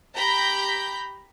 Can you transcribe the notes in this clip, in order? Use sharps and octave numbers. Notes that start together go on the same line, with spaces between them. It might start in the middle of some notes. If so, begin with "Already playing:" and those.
G4 A#5 B5 G6